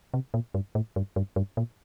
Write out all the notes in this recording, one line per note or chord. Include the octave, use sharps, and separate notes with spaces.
C3
A#2
G2
A2
G2
G2
G2
A#2